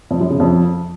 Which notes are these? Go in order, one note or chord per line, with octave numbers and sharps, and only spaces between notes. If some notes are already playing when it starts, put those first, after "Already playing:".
F2
F#2
C#3
F2